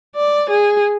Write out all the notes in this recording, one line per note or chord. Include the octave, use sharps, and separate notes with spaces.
D5
G#4